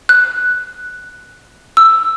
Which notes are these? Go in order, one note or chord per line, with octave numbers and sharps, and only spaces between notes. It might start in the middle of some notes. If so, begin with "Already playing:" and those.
F#6
E6